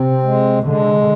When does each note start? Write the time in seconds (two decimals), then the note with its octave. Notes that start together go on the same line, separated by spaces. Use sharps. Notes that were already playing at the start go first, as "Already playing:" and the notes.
Already playing: C3 C4
0.23 G#3
0.64 D3 G#3